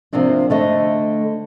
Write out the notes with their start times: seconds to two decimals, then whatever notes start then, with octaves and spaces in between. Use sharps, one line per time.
0.13 C3 F3 A#3 C4 D4
0.50 D3 A3 D#5